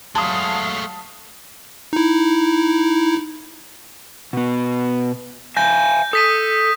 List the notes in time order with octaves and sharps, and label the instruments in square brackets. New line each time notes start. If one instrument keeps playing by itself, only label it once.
[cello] F#3 F5 [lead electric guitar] G#3 A3 [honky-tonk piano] A5 D#6
[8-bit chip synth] D#4 E4
[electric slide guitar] B2 B3
[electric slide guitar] E5 F5 G#5 [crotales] G6 A#6
[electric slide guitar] A4 [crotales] D#6 B6 D#7